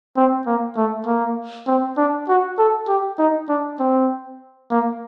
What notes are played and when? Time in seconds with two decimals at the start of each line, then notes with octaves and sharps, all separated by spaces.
0.17 C4
0.47 A#3
0.77 A3
1.06 A#3
1.67 C4
1.97 D4
2.29 F#4
2.59 A4
2.88 G4
3.18 D#4
3.49 D4
3.79 C4
4.71 A#3